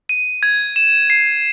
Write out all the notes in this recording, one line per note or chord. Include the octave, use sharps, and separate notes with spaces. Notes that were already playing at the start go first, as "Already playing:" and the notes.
D#7
G#6
E7
C7